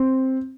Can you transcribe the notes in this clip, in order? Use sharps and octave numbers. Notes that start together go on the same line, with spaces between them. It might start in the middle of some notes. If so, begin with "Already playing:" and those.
Already playing: C4